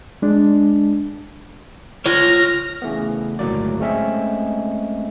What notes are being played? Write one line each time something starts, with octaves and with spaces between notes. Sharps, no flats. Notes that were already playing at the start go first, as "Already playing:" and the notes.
G#3 D4
F4 C#5 F6 A#6
C#3 E3 A3 B3
G1 C#2 A2 F#3 A#3 D5
G#3 A3 C4 C#4 D#5 E5